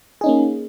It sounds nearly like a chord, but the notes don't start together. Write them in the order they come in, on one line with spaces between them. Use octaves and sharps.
G#4 D#4 C#4 A#3